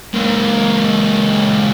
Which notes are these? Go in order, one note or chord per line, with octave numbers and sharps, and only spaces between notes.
C#2 A#3